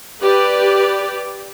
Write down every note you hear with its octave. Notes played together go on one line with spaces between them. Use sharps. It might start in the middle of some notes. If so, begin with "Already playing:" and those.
G4 B4 D5